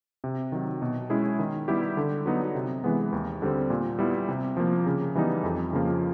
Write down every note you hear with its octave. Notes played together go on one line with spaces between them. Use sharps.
C3
D#3 F#3
B2
G#3 C#4 E4 G#4
D#3
G3 B3 E4 G4
D3
F#3 B3 D#4
C3
E3 G#3 B3
D#2
D3 G3 C4
A#2
G3 B3 E4
C3
F3 A#3
C#3
E3 G3 B3 D#4
F2
C#3 F3 A#3